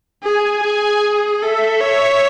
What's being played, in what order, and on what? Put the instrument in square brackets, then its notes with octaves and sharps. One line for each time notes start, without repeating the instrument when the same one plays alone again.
[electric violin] G#4 [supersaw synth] G#5
[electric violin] G#4
[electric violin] A4 [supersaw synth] E5
[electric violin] C#5